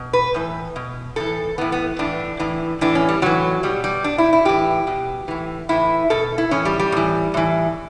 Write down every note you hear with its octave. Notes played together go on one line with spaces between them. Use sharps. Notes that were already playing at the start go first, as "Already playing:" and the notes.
Already playing: B2
B4
A2 E3
B2
A2 E3 A4
A2 E3 B3
B3
A2 E3 D4
A2 E3
A2 E3 D4
C#4
G3
A2 E3 F#3
B2 G3
G3
B2 D4
E4
E4
A2 E3 G4
B2
A2 E3
A2 E3 E4
B2 A4
E4
A2 E3 C#4
G3
G3
A2 E3
A2 E3